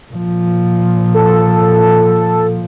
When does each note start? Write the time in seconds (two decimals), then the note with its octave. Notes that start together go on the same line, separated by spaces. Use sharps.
0.12 A#2 F3
1.14 A4